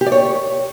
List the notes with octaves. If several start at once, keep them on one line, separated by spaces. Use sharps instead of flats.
G4
D5
C#5